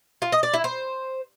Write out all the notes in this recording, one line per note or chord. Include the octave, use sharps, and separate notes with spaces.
F4
D#5
D5
E4
C5